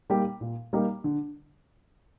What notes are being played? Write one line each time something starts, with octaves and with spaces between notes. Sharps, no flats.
G3 A#3 D#4 G4
A#2
G3 A#3 D#4 G4
D3